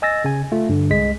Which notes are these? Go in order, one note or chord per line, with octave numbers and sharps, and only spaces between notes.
D#5 G#5 E6 A6 A#6
C#3 G#5
A3 F4
G2 D3
C2 G#3 B6